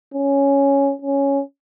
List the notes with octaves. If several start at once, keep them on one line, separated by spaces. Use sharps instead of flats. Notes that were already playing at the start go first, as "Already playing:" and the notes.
C#4
C#4